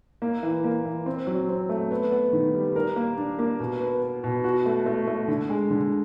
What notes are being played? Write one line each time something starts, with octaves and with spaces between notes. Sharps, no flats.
A#3
E3
A#3
E3
C4
F#3
C4
A3
B3
B3
D#3
G3
A#4
A#3
D4
A#3
B2
B3
B3
B2
F#4
A3
A3
A3
D3
G#3
D3